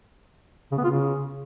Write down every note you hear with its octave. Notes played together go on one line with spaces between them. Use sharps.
C#3
B3
F4
C#3